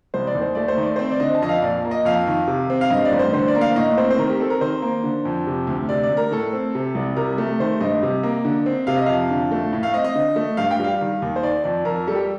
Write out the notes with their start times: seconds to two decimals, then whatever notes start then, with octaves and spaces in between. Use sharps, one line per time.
0.14 C2 C5
0.27 D5
0.35 D#2
0.41 C5
0.55 A3 D5
0.68 C5
0.77 D#3
0.83 D5
0.96 C4 C5
1.11 D5
1.20 D3 D#5
1.35 A5
1.42 F2 D#5
1.49 F5
1.62 A#2 D5
1.85 A#3
1.91 D#5
2.05 F2 F5
2.27 D#3
2.48 C3
2.70 C4
2.81 F5
2.90 G2 D#5
3.05 D5
3.12 A1
3.19 C5
3.33 D3 C5
3.48 D5
3.55 A#3
3.61 F5
3.76 A2 D#5
3.98 C4 C5
4.10 C5
4.18 D#3 A#4
4.29 G4
4.40 C4 A4
4.50 A#4
4.61 D#3 C5
4.82 A#3
5.04 D3
5.25 F2
5.47 C3
5.67 D2
5.89 C3 D5
6.04 D5
6.10 D2
6.17 A#4
6.31 A2 A4
6.53 C4
6.75 C3
6.95 C2
7.16 C3 A#4
7.38 A3
7.60 D#3 C5
7.80 G2 D#5
8.03 C3
8.23 A#3
8.45 D3
8.66 C4
8.87 C3 F5
8.97 D#5
9.06 F2 F5
9.30 D3
9.51 A3
9.73 A2
9.83 F5
9.94 C4 D#5
10.04 D#5
10.15 D3
10.36 A3
10.57 G2 F5
10.71 G5
10.80 G3 F5
11.01 D#3
11.22 D#2
11.36 C5
11.43 D#3 D5
11.64 F2 D5
11.85 F2 A#4
12.07 G3 A4
12.15 G4